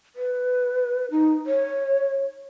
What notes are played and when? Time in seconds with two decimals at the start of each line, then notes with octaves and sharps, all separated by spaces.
0.16 B4
1.11 D#4
1.46 C#5